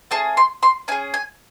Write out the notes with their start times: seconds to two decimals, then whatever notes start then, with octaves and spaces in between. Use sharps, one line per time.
0.11 A3 C#4 G#4 A5
0.37 C6
0.63 C6
0.88 C#4 G#5
0.92 G#4
1.14 G#5